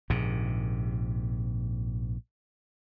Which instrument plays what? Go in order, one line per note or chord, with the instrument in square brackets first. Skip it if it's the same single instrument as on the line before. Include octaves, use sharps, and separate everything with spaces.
[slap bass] A#1 G#2 C3